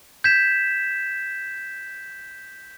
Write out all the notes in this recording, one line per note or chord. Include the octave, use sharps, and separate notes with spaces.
G6 G#6 B6 E7